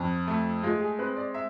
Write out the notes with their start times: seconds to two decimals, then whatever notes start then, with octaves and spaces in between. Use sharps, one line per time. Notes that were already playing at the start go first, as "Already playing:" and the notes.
Already playing: F2
0.27 A3
0.63 G#3 F4
0.81 G#4
0.99 C4 B4
1.16 D5
1.34 E5